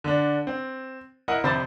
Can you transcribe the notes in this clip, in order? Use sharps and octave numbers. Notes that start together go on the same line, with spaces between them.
D3 D4
C4
E4 A#4 D#5 F#5
F1 C3 C5 E5 B5 A6